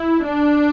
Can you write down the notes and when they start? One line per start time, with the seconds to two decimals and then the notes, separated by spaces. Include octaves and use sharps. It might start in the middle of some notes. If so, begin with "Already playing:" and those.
Already playing: E4
0.25 D4